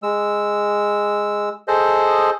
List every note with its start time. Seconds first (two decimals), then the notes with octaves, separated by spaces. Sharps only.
0.03 G#3 E6
1.68 G#4 A4 C5 D#5